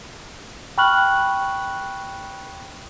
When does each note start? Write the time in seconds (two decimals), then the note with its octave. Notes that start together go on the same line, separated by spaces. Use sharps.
0.78 G5 B5 C#6 F6 F#6 F#7